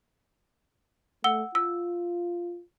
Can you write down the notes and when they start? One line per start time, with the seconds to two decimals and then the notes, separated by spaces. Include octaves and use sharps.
1.24 A3 F#5 E6 G7
1.55 F4 E6